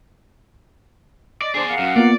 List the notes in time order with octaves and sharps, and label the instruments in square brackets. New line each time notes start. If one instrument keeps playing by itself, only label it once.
[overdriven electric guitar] D5 [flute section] D#5
[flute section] D4 C5 D6 [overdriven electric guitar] G#4 D5
[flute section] A#4 F5 F#5
[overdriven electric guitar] F#2
[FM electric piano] A#3 B3 F4 [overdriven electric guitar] D5